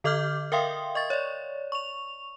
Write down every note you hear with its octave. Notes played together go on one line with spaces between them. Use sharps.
D3 A4 D#5 D6 F6 G6
A#4 E5 F5 G5 C6 D#6
D#5 C#6 A6
C#5 D5
C#6 F7